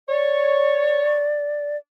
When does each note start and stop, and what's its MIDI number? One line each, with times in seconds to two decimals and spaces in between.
0.09 1.25 73
0.09 1.77 74